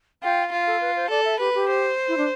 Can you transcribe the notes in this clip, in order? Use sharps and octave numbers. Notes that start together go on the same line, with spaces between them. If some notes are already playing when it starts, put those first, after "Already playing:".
F4 G5
F4 F5
A4
B4
C5
A4 D5
E5
G4 B4
G4
C5
E4
D4